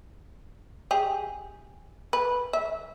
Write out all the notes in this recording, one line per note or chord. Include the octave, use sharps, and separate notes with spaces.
G4 G#4
B4
E5